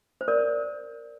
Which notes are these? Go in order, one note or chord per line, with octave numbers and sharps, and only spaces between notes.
C5
A#4 D5